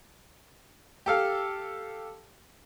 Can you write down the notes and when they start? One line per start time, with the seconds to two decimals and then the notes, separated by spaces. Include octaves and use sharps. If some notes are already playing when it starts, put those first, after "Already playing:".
1.06 G4 A4 F5